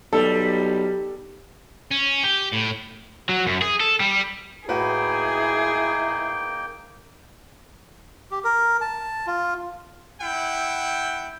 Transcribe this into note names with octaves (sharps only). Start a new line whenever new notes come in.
B1 G3 A4
C#4
G4
A2
F#3
F#2
G#4
A4
G3
A2 A#3 D#4 E4 F#4 G#4 B4 G5
G4
A#4
A5
F4
E4 F#5 G5